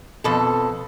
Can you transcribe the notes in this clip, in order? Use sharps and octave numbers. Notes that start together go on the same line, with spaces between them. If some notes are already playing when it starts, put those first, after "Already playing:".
F2 B2 A4